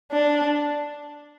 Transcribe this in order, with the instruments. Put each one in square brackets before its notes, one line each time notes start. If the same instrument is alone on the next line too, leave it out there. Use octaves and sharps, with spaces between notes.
[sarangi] D4